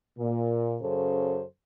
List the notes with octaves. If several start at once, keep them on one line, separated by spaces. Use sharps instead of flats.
A#2
F#2 C#3 A4 C5